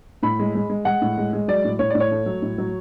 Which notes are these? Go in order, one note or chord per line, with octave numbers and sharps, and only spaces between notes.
A2 B5
G#3
G#3
G#3
G#3 F#5
A2
G#3
G#3
F#3 D5
A2
A2 C#5
A2 D5
C#5
A3
F#3
A2
F#3